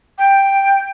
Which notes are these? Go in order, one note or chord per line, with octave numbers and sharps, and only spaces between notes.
G5